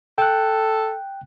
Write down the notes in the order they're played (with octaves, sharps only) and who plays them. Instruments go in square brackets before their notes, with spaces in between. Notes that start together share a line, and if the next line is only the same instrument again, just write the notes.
[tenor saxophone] A4 [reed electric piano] G5 F#6